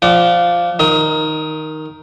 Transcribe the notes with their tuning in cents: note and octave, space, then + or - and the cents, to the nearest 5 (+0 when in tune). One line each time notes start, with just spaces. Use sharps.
F3 +0 D5 -5 F#5 +40
D#3 +0 D#6 +35